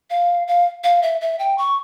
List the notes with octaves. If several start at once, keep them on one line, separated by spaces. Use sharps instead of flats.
F5
F5
F5
E5
E5
G5
C#6